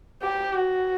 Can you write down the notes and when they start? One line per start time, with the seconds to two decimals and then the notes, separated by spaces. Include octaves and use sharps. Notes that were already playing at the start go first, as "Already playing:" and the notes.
0.23 G4
0.54 F#4